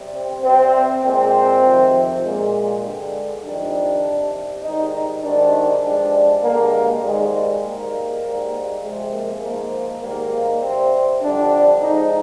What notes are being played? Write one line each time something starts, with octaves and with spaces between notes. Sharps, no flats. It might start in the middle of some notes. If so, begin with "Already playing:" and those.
Already playing: C3 G3
C4
C3 G3 C4
A#2 G#3 C4
F2 C3 D#3
A#2 G#3
G2 D3 G#3
F2 D#3 G3 D4
C3 G3
G#2 D#3 G3 D#4
D#4
G#2 D#3 G3 D4
G2 F3 G#3 D4
G2 D3 G#3 A#3
G#2 D#3 G3 G#3
G#3
G#2 G3 A#3
G#2 G3
C3 F3 G#3
A#3
G#2 F3 G#3 A#3
G#2 D#3 G3 A#3
C3 G3 C4
F2 D3 G3 D4
G#2 F3 G#3 D#4